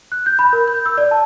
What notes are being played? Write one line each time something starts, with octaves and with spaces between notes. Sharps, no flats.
F#6
G6
B5
A#4
G6
E6
D5
A5